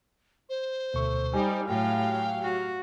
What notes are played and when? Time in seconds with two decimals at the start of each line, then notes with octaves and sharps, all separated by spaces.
0.49 C5
0.94 D2 B2 A3 C#6
1.34 G3 D#4 D5 G#5
1.68 A2 F#3 G4 F5 G5
2.43 F#4